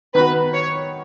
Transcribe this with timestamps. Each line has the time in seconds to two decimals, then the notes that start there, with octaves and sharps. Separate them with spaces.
0.15 D#3 B3 F#4 B4
0.53 C#5